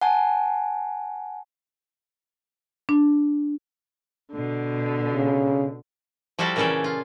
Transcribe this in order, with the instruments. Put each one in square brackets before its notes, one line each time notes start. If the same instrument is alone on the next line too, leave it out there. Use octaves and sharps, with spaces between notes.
[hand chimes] F#5 G#5 A5
[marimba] D4
[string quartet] B2 D3
[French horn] C#3
[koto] F3 G3 E4 F#4 A4 D5
A#2 C#3 E3 C#4 A4 D5
F4